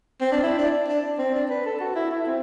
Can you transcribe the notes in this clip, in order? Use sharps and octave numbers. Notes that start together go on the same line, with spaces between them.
C4
D4
E4
D4
D4
C4
D4
B4
A4
F#4
E4
E4
C4